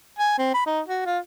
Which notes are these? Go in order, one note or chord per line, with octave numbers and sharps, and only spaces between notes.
G#5
C4
B5
D#4
F#4
F4